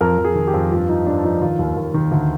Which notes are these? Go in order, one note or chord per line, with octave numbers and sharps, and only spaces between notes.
F2 A#4
F2
G#4
D#3
G4
F2
G2 F4
F3 D#4
G2 D4
F3 D#4
D#3 F4
D#2
D#2
D#3
D2